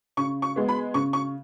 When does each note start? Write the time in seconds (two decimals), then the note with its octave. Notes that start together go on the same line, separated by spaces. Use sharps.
0.17 C#3 C#6
0.42 C#6
0.56 G#3 B3
0.69 B5
0.94 C#3 C#6
1.13 C#6